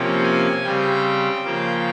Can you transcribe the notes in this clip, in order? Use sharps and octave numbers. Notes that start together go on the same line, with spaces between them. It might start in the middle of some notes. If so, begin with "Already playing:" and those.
Already playing: C3 F3 A#3 C#4 G5
G#5
C#3 G3 C4 G5
C#3 F3 A#3